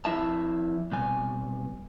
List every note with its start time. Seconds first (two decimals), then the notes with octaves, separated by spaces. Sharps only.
0.05 F2 E4 E5 A5
0.92 C2 B2 G#5